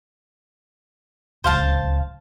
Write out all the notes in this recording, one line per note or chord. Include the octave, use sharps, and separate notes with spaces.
D1 C#2 C5 F5 A5